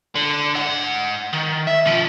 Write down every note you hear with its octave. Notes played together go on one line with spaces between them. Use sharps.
D3
G#2 F#5
D#3
E5
B2 F3